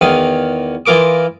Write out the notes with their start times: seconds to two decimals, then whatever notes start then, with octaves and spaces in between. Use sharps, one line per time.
0.01 E2 D#3 F5 D#6
0.86 E3 F4 A#4 D6 D#6